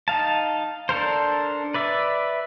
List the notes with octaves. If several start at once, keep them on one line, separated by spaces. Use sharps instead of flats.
D#4 F5 A5
D4 A4 A#4 C5
B4 D5 E5